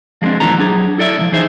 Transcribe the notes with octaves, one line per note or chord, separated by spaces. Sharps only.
F3 G#3 A#3 C4 D4
D#2 A#2 E3 G3 A4 A#5
F#3 D4 G#4
E4 A4 D5 E5
D2 F3
E3 D#4 G#4 C5 E5